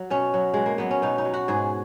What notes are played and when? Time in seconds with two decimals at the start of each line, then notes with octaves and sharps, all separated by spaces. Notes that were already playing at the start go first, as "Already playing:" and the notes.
Already playing: F#3
0.10 B2 C#4
0.34 F#3
0.54 B2 G#3
0.66 A#3
0.78 F#3 B3
0.91 C#4
1.02 B2 D#4
1.18 D#4
1.25 F#3
1.34 F#4
1.48 G#2 G#4